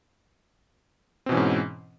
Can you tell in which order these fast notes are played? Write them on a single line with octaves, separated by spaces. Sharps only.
C4 B2 E3 C#4 G#2